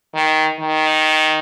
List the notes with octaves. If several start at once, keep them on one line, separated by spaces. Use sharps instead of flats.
D#3
D#3